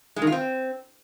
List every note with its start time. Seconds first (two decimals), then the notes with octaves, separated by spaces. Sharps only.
0.16 G#3
0.22 D#3
0.27 F4
0.32 C4